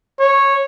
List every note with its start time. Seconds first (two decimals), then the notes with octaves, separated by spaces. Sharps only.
0.20 C#5